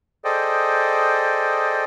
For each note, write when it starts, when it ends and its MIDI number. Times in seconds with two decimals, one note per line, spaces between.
0.25 1.85 68
0.25 1.85 69
0.25 1.85 72
0.25 1.85 74
0.25 1.85 75
0.25 1.85 79